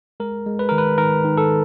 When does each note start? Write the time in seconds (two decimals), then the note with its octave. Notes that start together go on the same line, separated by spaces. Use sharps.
0.20 G#3 A#4
0.46 G#3
0.59 B4
0.69 D#3 A#4
0.78 B4
0.98 D#3 A#4
1.24 D#3
1.37 A4